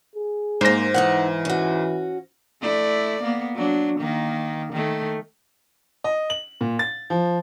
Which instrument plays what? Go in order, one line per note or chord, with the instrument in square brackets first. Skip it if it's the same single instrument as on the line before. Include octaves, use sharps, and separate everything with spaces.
[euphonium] G#4
[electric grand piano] G#2 A#6 [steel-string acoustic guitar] G#3 A#3 [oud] C5
[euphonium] E3 [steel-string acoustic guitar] D#4 A4 F#5
[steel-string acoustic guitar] C#4 F#4
[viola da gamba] A3 E4 D5
A#3 B3
F#3 D4
D#3 A#3
D#3 A3
[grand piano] D#5
F#7
A#2
A6
F3